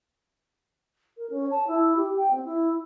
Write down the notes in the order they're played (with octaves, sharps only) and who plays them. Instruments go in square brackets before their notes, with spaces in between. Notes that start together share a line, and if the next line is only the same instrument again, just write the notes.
[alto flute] A#4
C#4
A5
E4
G4
G5
C4
E4